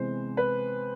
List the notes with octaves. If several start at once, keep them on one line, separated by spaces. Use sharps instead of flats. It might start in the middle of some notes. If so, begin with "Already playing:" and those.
Already playing: C3 E3 G#3 B3 C5
B4